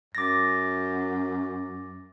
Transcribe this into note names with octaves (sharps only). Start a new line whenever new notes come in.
F#2 D6 A6 A#6